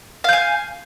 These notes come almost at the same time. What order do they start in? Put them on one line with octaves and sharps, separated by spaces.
F5 G6 G#5